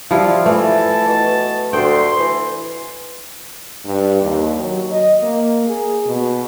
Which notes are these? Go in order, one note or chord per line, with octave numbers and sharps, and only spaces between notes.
F3 G3 E4 F5
E3 A3 A5
B2
D2 C5 G5 C6
E3
G2
D#2
F#3
D#5
A#3
G#4
B2